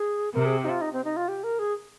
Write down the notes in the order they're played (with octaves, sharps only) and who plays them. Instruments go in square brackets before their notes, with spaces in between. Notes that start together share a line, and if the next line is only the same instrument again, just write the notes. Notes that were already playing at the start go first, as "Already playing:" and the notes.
Already playing: [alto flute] G#4
[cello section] C3 [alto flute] A#4
[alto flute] G#4
G4
D#4
F4
D#4
C4
D#4
F4
G4
A#4
G#4